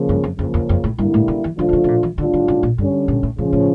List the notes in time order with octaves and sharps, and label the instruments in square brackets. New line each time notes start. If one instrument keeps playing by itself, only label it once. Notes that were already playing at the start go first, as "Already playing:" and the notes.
Already playing: [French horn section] C#3 F3 A#3
[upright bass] G2
F2
[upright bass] F2 [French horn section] C#3 F3 A#3
[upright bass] E2
F2
A2
[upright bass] G2 [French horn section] D3 G3 A#3 E4
[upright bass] A2
C#3
E3
[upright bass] D3 [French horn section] F3 A3 D4 F4
[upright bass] D3
C#3
C#3
A#2
E3
[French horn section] A2 G3 D4 F4 [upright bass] D3
[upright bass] D3
C#3
A#2
[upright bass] G2 [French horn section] D3 G3 C#4
[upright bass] A#2
A2
[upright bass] A2 [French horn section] C#3 F3 C#4
[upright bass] A2